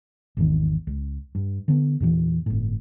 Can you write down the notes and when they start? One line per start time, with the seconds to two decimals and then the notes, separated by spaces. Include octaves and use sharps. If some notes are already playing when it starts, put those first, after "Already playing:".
0.37 G#1 E2 D#3
0.87 C#2
1.35 G2
1.68 D3 B3
2.00 E2 A#2 E3
2.46 G1 A2